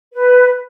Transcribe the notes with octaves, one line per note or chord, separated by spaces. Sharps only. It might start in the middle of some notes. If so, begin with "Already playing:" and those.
B4